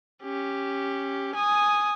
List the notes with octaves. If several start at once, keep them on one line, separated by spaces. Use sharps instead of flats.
C#4 G4
G#5 D#6